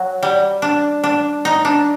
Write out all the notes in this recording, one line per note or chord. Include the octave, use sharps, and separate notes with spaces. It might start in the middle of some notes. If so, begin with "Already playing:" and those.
Already playing: F#3
G3
D4
D4
D#4
D4